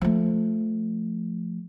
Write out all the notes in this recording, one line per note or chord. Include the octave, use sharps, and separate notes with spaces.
F3 A3